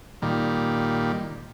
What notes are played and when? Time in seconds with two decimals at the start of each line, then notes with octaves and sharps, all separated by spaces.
0.22 A#2 D#3 G3